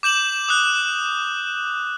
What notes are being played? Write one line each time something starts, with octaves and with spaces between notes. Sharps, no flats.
D6 G6 E7 F#7
D#6 F#6